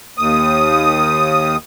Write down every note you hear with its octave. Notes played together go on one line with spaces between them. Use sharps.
D#2 D#6